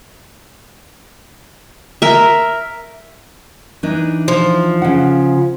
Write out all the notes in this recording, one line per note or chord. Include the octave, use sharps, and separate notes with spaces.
A#4 E5
E3 D4 D#4
F3
C#3 F#5